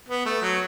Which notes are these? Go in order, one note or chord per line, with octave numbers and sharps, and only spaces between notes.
B3
A3
F#3